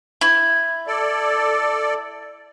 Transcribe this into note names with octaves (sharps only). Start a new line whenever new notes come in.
E4
A4 D5